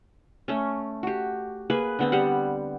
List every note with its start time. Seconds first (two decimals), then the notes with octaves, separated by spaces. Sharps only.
0.48 A3 C#4
1.03 F#4 G4
1.70 A#3 G#4 B4
1.99 D3 B3 C4
2.12 G3 G4 F#5